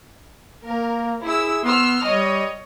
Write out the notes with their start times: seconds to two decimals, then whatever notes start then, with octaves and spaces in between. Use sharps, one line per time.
0.65 A#3 A#4
1.23 E4 G#4 E6
1.64 B3 C6 E6 F6
2.05 G3 C#5 D#5